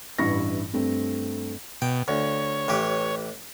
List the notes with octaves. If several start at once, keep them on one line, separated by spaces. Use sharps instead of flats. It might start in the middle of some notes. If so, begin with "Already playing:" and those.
A1 G2 E3 E4 C#6 A#6
G2 A3 C4
B2 G5
D2 C#5
A1 E3 G4